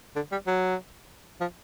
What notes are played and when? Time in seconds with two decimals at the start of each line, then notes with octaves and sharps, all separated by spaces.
0.16 D3
0.32 G3
0.47 F#3
1.41 F3